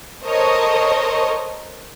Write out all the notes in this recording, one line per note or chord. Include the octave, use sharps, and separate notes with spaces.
A4 A#4 C5 C#5 D#5